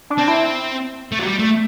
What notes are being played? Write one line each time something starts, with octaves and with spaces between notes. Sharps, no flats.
D4
C4
E4
A3
F#3
G3
A3